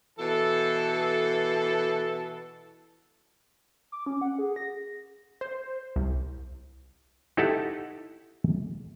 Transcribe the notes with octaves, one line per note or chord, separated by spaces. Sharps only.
B2 E3 A4
D6
C#4
F#5
G#4
A#6
C5
C2
D#4 E4 G4 A4 F#5 A5